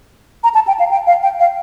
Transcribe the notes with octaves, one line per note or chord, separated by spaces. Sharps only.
A#5
A5
G5
F5
G5
F5
G5
F5